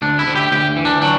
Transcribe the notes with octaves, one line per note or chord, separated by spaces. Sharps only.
D2 D4
E4
D2
G4
D2 G4
E3
D4
F#3 D4